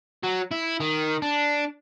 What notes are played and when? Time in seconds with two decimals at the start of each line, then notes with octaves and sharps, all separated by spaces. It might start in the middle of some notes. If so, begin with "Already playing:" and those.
0.23 F#3
0.51 E4
0.80 D#3
1.22 D4